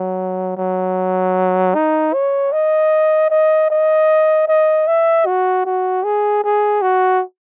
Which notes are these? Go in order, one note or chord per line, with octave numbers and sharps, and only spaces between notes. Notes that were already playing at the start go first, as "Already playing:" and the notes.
Already playing: F#3
F#3
D#4
C#5
D#5
D#5
D#5
D#5
E5
F#4
F#4
G#4
G#4
F#4